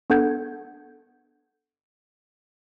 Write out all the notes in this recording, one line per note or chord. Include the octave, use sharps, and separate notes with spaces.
B3 D4 A4 F#5 G6 G#6